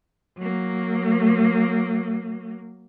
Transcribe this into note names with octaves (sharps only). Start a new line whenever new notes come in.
F#3 A#3